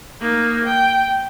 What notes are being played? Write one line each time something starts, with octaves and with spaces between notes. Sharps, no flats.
A#3 D#4
G5